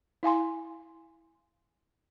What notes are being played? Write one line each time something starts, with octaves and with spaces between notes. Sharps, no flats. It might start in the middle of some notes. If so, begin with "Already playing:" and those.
E4 F5 G#5 C6